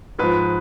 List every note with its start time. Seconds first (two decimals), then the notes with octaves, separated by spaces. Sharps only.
0.19 G#2 F3 B4